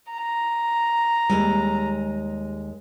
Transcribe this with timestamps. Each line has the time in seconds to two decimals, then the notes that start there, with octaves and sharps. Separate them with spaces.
0.12 A#5
1.29 D#2 G3 G#3